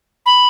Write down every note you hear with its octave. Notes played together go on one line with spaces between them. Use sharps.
B5